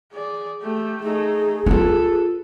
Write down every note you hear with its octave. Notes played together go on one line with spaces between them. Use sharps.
G#4 D5
A3 G4
A3 D#4 G#4
D#4 F4 A4 B4